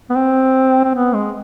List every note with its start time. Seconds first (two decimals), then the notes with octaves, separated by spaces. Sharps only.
0.10 B3
0.15 C4
0.84 C4
0.94 B3
1.13 G#3